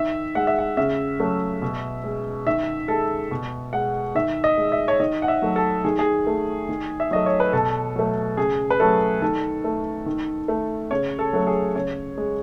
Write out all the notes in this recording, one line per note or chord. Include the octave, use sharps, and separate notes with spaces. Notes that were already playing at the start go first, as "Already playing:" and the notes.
Already playing: D#3 E5
G#3 F#5
E5
F#5
C#3 E5
F#3 A3
B2
G#3
D#3 E5
G#3 A4
B2
G#3 F#5
D#3 E5
D#5
G#3
E5
C#5
D#3 D#5
F#5
E5
F#3 A3
A4
D#3 G#4
G#4
A3
D#3
E5
F#3 A3 D#5
C#5
B4
B2 A4
F#3 A3
C#3 G#4
B4
F#3 A3 A4
D#3 A4
A3
D#3
A3
C#3 C#5
A4
F#3 A3
G#4
C#3 C#5
G#3